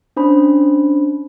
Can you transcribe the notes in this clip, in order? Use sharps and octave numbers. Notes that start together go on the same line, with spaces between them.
C#4 D4 C5 B5